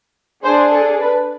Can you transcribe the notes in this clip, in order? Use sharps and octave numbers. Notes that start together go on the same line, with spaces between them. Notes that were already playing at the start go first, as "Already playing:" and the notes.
D4 G#4 C5
A4
B4